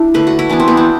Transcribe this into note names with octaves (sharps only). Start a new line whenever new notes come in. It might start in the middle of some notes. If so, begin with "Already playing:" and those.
Already playing: D4 E4
D3 A3 B4
F#4
E4
E3 B3 D4
C4
B3
C4